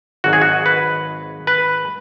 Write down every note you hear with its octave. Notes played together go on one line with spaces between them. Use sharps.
G#1 G#2 F#3 F#4
G#4
F#4
B4
B4